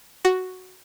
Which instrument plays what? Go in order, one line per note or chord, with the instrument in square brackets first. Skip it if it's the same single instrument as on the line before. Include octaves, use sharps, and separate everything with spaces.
[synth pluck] F#4